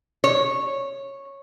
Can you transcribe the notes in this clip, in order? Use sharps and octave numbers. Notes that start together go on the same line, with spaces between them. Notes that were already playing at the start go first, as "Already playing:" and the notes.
C#5